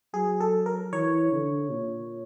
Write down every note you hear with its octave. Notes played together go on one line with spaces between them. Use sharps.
F#3 G#4
A4
A#4
E3 C#5
D3
A#2